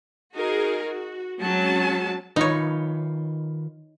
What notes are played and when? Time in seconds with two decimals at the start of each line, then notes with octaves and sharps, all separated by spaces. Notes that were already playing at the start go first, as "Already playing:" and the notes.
0.35 D#4 F#4 G#4 A#4
0.85 F#4
1.43 F#3 G#3 C4 C#4 A5
2.36 D#3 D#4 F4 B4 C#5